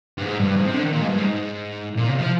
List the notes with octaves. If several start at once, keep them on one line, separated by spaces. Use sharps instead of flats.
G2
G#2
G2
G#2
C3
D3
D#3
A#2
G#2
G2
G#2
A#2
C3
F3